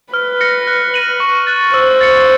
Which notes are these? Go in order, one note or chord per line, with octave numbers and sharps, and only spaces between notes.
B4 F6
A#6 C#7
F#6
A#6 D#7 F#7
C#6
F#6 A6
C5 E6
A6 C#7